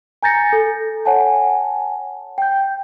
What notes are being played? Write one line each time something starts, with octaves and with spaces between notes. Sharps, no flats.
G#5 A#5 G6 A6 A#6 C#7
A4
C#5 F#5 G#5 A5
G5 G6